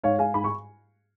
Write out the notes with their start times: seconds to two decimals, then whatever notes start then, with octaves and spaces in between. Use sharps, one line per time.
0.03 G#2 C#5 F5
0.19 G#2 F5 G#5
0.34 G#2 B5
0.44 C#6